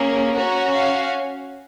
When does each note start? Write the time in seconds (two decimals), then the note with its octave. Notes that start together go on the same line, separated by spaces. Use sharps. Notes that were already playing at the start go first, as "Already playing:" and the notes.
Already playing: A#3 C#4 G#4
0.35 C#4 F#4 A#5
0.75 F5